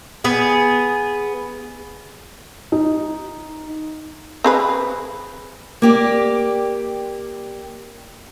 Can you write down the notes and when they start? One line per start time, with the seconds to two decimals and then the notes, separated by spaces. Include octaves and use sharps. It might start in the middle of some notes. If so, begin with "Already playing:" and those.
0.24 B3 G#4
2.72 D#4
4.44 C4 G#4 B4
5.82 A#3 G4 D5